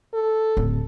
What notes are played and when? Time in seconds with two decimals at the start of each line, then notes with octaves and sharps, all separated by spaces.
0.14 A4
0.57 D1